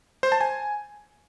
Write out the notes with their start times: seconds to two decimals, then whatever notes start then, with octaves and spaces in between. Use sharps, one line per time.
0.23 C5
0.32 A5
0.41 G#5